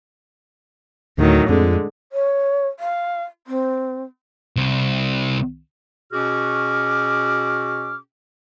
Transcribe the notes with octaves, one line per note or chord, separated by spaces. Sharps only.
D2 A2 D#3 F#3
F2 D3 G#3
C#5
F5
C4
C2
B2 C#4 F#4 G#4 D6 F6